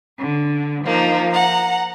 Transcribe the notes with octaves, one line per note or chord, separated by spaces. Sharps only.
D3
F3 A#3 D#4
F#5 A#5